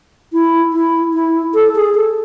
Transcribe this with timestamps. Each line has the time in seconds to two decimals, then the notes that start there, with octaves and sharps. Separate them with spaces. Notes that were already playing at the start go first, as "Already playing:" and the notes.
0.33 E4
0.73 E4
1.14 E4
1.54 A4
1.75 G#4
1.95 A4